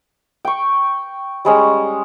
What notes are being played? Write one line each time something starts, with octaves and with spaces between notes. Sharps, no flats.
G5 C#6
G3 G#3 C#4